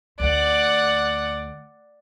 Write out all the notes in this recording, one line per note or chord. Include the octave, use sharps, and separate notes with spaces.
D2 D5 F#5